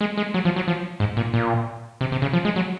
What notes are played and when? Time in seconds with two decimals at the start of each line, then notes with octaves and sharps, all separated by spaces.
0.01 G#3
0.18 G#3
0.34 F#3
0.45 F3
0.56 F#3
0.68 F3
1.00 G#2
1.17 A#2
1.34 A#2
2.01 C3
2.12 C3
2.22 C#3
2.33 F3
2.45 G#3
2.56 F#3